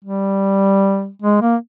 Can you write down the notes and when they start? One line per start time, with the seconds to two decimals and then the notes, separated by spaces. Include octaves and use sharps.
0.05 G3
1.22 G#3
1.41 A#3